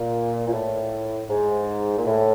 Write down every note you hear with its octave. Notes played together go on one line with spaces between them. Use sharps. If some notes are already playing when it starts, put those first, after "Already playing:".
Already playing: A#2
A#2
A2
G#2
A#2
A2